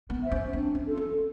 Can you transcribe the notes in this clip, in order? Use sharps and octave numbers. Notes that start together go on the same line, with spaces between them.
B3
C5 E5
C#4
C4 D4
C#4
F4 A4
C#4